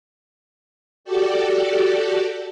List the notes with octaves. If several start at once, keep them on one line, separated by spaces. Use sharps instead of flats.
F#4 G4 A4 D5